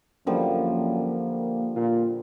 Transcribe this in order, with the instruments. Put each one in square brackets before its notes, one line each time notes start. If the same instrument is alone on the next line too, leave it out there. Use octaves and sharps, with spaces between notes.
[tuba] F#2 [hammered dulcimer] D3 F3 G3 [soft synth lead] A#3
[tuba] A#2 [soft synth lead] F4